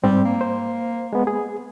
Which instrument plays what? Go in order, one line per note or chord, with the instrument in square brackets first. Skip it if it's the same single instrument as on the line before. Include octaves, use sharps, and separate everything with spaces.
[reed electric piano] G#2 C4 [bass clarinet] G3
[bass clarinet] A#3
[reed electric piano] C5
G#3 B3
G#4